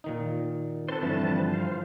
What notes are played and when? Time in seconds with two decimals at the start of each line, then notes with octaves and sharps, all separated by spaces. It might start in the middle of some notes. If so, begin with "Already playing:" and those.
0.04 A#2 D#3 D#4
0.89 C4 A4 B4 C5 A5
1.03 G2 D3 E3 F3
1.54 C5 F5